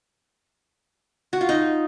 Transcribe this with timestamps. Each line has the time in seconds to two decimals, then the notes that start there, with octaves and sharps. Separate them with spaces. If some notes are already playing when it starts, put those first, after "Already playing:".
1.33 F#4
1.41 F4
1.49 D#4